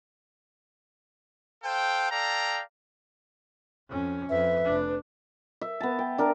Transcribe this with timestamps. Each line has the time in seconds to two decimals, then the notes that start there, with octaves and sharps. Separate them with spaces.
1.64 A4 C5 F5 G5
2.12 A4 D5 F5 G5 A#5
3.88 F2 C#4
4.30 F2 B4 E5
4.64 F1 D4
5.61 E5
5.81 B3 A5
5.99 G5
6.18 D4 A#4